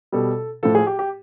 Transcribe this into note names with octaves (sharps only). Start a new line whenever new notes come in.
B2 G3 A4
A2 F3 A4
G#4
G4
G4